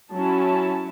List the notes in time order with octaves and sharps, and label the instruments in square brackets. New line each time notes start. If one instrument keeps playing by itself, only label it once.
[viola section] F#3 C#4 E4 A5